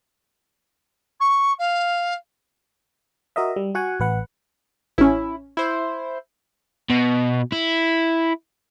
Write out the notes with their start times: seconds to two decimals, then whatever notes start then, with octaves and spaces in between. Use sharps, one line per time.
1.20 C#6
1.58 F5
3.36 F#4 A#4 D#5 E5
3.56 G3
3.75 F#4 F#5 G#5
4.00 A1 B4 F#5
4.98 A1 C#4 E4
5.57 E4 C5
6.90 B2
7.52 E4